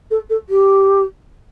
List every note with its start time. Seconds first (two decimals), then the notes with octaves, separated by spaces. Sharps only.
0.10 A4
0.29 A4
0.49 G4